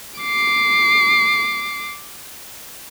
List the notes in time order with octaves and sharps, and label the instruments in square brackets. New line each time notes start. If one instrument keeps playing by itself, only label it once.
[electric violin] D6 C7